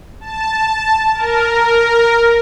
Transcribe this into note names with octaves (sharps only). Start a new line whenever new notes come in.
A5
A#4